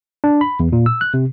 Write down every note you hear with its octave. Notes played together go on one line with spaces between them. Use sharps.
D4
B5
E2
A#2
E6
F#6
C3